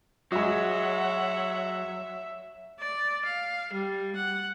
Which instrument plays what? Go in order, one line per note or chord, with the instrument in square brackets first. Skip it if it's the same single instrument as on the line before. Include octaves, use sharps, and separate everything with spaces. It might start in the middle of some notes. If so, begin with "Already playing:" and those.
[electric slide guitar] F#3 [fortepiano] G#3 F#4 [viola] C#5 F#5 [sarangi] E5
[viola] D5
F5
G3
F#5